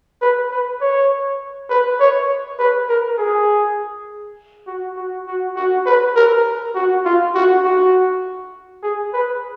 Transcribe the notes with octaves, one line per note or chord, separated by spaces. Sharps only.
B4
B4
C#5
B4
C#5
B4
A#4
G#4
F#4
F#4
F#4
F#4
B4
A#4
F#4
F4
F#4
F#4
G#4
B4